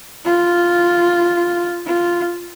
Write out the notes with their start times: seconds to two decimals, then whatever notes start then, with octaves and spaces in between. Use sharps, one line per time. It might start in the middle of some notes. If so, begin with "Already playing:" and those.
0.25 F4
1.86 F4